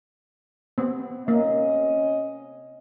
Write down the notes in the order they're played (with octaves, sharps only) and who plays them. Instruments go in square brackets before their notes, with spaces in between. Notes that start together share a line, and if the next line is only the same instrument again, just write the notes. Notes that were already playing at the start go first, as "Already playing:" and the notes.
[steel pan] B3 C4
[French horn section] C3 C#4 D#5 [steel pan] A#3